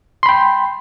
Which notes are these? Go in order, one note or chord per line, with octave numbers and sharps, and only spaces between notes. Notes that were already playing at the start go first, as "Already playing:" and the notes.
G5 B5 C6